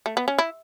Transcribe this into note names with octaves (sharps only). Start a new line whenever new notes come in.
A3
B3
C#4
E4